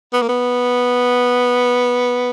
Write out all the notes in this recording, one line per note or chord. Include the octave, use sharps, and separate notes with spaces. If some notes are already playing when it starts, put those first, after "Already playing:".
B3
A#3
B3